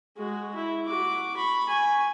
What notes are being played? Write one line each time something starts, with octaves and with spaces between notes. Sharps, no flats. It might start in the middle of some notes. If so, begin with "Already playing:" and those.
G#3 F#4
E4
F#4 D6
B5 C#6
G#5 C#6